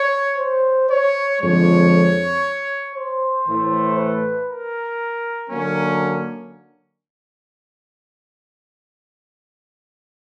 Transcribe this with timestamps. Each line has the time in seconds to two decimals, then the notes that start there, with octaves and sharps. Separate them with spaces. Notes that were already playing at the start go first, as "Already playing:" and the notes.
Already playing: C#5
0.38 C5
0.89 C#5
1.40 F2 D3 F3 G#3 C#5
2.94 C5
3.45 A2 E3 A3
3.97 B4
4.48 A#4
5.50 D3 F#3 A#3 C#4